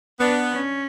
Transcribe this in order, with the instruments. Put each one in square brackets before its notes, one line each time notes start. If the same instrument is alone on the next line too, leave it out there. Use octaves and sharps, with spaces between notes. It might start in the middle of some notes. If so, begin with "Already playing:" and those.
[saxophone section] B3 [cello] D4
[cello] C#4